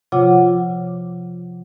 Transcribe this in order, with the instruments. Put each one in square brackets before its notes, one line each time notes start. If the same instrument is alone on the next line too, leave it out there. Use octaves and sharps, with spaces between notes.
[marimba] C3 F3 F4 C#5 F#5 D6